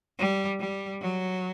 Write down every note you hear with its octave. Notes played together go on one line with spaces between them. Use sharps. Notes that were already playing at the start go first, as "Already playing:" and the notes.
G3
G3
F#3